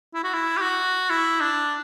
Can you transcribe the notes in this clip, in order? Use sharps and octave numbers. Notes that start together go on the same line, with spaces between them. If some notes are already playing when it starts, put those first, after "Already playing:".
E4
F#4
E4
G4
F#4
E4
D4